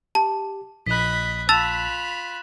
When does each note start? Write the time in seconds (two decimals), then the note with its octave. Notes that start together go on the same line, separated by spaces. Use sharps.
0.15 G4 A5
0.87 A#1 D#5 B5 F#6 B6
1.49 F4 A5 B5 E6 A6 E7 F7